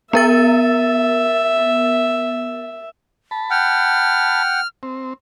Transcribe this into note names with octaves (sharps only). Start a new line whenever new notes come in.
B3 A#4 E5 A6
A5 B5
F#5 G5 F6
C4